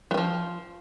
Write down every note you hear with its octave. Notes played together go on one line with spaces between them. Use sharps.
D#3 F3 F#3